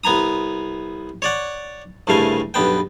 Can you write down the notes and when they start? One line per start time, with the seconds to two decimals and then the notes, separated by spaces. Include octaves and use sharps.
0.04 C2 B3 G#5 A#5 D#6
1.22 C#5 D5 F#5
2.07 C2 G2 C#3 A3 F5 G#5
2.54 B1 G2 B3 G5